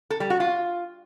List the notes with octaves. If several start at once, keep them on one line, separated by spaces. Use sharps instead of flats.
A4
G3
F#4
F4